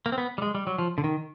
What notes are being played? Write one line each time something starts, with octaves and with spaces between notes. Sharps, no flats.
A#3
C4
B3
G3
G#3
G3
F#3
F3
D3
D#3